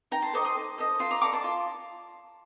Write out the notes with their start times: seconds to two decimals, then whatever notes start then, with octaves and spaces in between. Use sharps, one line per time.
0.11 D#4 G5 A#5
0.22 A5 C6
0.33 A4 C5 D#5 A#5 D6
0.45 C6 D#6
0.56 D#4
0.78 A4 C5 D#5
0.99 F4 A5 C6
1.11 A#5 D6
1.22 A4 D5 A#5 D6
1.33 A5 C6
1.44 F4